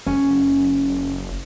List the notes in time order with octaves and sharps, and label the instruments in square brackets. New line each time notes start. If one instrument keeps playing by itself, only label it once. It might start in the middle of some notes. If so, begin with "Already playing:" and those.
[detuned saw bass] F#1 [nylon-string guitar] C#4